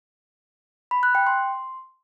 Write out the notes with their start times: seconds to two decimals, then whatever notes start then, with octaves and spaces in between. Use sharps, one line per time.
0.91 B5
1.03 F#6
1.15 G5
1.27 C6